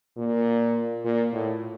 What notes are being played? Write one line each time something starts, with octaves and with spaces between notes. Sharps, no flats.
A#2
A#2
A2